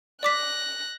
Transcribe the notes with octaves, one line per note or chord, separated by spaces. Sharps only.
D5 D6 F#6 A#6 B6